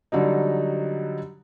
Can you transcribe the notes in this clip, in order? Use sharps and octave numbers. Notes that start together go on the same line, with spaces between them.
D3 F#3 G3 D#4